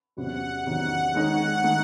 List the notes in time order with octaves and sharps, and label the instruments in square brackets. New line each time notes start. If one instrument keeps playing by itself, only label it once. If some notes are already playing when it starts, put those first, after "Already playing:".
[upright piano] E2 C3 F#3 C#4 [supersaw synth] F#5
[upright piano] E2 C3 D#3 F#3 C#4 [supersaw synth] F#5
[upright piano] D#3 G#3 D#4 G#4 C#5 [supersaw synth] F#5
[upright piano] D#3 A3